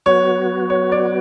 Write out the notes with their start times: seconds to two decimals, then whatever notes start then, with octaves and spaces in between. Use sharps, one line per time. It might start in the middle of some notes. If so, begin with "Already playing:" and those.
0.06 F#3 B3 F#4 C#5
0.70 C#5
0.92 D5